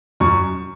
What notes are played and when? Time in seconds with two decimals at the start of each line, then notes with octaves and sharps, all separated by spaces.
0.20 F#2 C#6